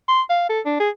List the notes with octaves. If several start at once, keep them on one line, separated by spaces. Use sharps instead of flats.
C6
F5
A4
D4
G#4